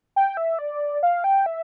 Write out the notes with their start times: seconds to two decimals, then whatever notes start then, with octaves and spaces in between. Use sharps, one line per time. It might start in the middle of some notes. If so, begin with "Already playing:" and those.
0.16 G5
0.37 E5
0.59 D5
1.03 F5
1.24 G5
1.46 E5